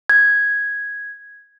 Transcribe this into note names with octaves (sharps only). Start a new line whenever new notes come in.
G#6